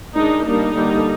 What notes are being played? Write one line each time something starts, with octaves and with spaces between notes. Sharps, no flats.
D#3 G#3 D4 D#4
G3 A#3 D4 D#4
D3 G3 A#3 D4